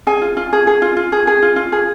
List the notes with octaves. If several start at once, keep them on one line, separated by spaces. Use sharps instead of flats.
G#4 G#5
F4
F4
G#4
G#4
F4
F4
G#4
G#4
F4
F4
G#4